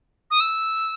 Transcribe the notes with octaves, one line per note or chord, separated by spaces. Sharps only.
D#6
E6